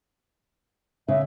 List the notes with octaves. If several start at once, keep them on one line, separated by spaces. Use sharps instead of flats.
C#3 E5